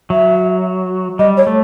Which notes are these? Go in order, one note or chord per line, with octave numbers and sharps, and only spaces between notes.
F#3 E5
G3 D#5
C#5
A3